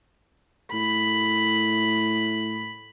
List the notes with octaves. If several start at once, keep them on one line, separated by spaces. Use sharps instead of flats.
A2 B5